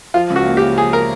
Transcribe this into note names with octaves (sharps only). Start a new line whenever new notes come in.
F3 F4
C#2
F#4
A#3
G4
C#3
F3 G#4
A#4